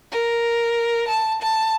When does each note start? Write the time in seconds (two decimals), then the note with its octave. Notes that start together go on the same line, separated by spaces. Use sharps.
0.12 A#4
1.08 A5
1.42 A5